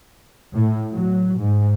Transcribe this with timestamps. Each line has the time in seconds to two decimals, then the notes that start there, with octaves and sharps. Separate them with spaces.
0.53 A2
0.92 F#3
1.40 G#2